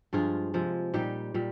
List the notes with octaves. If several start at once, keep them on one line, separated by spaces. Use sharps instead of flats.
G2 F3 G#3 F4 G#4
C3 F3 G#3
A#2 G3 D#4 G4
A#2 G3